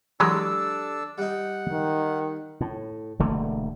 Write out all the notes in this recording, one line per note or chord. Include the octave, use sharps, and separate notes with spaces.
E3 F#3 G#3 D4 G4 A4 E6
G3 D#4 F#5
D#3
A2
E1 D3 A3 A#3